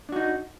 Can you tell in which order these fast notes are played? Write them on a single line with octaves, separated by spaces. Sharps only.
D4 F#4 D#4